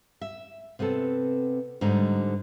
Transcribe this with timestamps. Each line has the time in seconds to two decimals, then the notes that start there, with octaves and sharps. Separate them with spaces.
0.21 E5
0.79 C3 B3 C4 A4
1.81 G#2 D3 G3 D#4